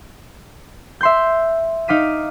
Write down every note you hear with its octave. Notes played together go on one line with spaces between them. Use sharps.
E5 C6 G6
D#4 F5 D6 B6 D#7